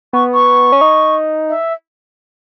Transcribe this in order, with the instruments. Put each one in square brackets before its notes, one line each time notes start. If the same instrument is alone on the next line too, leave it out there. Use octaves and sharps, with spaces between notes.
[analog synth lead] B3 [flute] C#6
[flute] C#6
[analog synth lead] C#4
D#4
[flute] E5